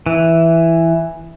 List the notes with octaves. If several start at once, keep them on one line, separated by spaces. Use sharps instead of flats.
E3